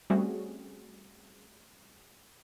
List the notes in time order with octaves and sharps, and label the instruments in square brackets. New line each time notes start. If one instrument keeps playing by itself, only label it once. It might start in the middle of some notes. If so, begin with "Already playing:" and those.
[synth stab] G3 A3 C4 C#4 F#4 G#4